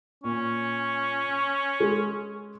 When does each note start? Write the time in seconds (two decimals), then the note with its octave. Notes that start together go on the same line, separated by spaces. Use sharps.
0.24 A#2 C#4
1.80 G#3